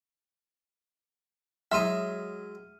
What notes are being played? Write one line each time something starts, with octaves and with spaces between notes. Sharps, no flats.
F#3 G#3 E5 A#5 C6 D#6 F6 D#7